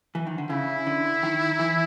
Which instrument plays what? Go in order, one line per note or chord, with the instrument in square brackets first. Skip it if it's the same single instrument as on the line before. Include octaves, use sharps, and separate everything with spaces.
[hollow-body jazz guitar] E3
D#3
D3
[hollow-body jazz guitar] C#3 [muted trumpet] E4
[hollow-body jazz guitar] D3
D#3
E3